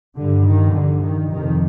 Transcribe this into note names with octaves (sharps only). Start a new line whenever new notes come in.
G2 D3
D#3
G2 D3
D#3
F2 C3 D#3